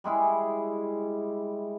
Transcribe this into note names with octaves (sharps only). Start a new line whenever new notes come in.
G3 G#3 E4 G#4